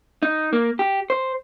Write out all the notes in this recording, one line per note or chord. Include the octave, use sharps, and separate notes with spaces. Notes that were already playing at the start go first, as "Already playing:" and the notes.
D#4
A#3
G4
C5